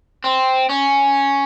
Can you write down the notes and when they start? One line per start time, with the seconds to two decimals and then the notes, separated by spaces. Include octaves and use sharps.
0.24 C4
0.69 C#4